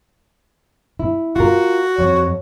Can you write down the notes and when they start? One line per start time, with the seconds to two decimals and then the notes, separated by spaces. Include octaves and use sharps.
0.99 E4
1.36 F4 F#4 A#4
1.98 F2 C#5